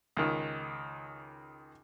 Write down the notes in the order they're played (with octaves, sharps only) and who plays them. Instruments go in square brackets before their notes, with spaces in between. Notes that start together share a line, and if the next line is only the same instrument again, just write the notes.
[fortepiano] C#2 D#3